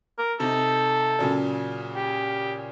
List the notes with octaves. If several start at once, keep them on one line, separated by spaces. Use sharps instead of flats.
A#4
C3 D#4 A4
A#2 C#3 F#3
G4